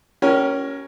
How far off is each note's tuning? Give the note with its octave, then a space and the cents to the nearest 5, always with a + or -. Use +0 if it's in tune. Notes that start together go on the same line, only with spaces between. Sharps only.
C#4 +0 G4 -30 A#4 +20